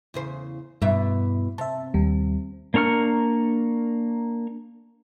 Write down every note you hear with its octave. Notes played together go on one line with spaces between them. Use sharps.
E2 C#3 C5
E2 G2 B2 E5
C3 E5 A5
D#2 G3
A#3 D4 A#4 C#6 F6